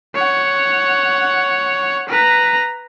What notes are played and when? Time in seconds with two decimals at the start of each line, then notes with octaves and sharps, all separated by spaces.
0.15 C#5 F#5
2.09 B4 A#5